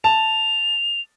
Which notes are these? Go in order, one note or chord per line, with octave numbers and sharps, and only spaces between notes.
A5 F7